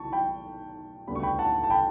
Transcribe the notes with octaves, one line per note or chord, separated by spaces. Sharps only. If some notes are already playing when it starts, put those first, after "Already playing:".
Already playing: B1 A5 C#6
G5 B5
D2 C#3 G3 B3 B5
C#6
G5 B5
F#5 A5
A5
G5 B5